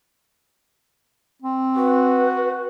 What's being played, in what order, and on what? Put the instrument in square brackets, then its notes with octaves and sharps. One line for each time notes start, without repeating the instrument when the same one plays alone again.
[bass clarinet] C4
[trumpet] F#4 [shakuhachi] B4